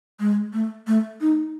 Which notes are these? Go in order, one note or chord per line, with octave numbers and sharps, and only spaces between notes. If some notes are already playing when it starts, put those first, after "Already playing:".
G#3
A3
A3
D#4